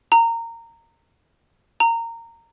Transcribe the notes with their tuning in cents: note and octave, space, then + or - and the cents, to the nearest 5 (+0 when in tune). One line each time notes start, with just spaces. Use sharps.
A#5 -20
A#5 -20